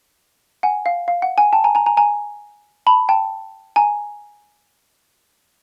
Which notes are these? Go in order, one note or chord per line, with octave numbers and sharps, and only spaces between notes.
F#5 G#5
F5
F5
F#5
F#5 G#5
G5 A5
G#5 A#5
G#5 A#5
G#5 A#5
G#5 A#5
A5 B5
G5 A5
G#5 A#5